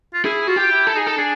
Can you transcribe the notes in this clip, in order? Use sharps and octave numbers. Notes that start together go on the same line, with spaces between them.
F4
E4 G#4
F4 F#4
G4
E4
A4
D#4 G#4
A4
D4 G#4